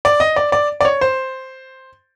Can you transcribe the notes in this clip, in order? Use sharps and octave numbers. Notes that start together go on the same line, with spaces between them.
D5
D#5
D5
D5
D5
C#5
C5